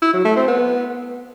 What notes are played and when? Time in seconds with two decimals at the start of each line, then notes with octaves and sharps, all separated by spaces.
0.02 E4
0.14 F#3
0.25 A3
0.36 C4
0.48 B3